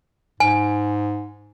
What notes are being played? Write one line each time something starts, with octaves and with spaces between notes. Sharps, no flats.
G#2 G#5